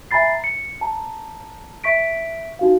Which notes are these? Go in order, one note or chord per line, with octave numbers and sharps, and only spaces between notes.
E5 G#5 A#5 B5 A6 C7
C#7
A5 A#5
E5 C#6 B6 D7
D#4 F#4 F5